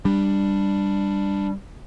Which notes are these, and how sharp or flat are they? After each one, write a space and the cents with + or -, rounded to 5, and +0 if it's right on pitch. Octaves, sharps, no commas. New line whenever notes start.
G3 +10 D4 +0